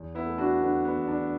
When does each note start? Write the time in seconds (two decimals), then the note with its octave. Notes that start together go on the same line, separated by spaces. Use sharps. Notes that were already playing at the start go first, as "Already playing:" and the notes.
Already playing: E2
0.15 B3 E4
0.26 A3
0.38 D4 F#4
0.62 D3 B3
0.85 B3
0.97 E2
1.08 D4